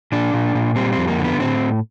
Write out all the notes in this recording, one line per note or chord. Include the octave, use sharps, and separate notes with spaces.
A#2 D4
A#2
A#2
G3 C4
F2 C4
A#3
D3
B3
A2 C4